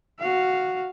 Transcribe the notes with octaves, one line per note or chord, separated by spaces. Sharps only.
F#4 F5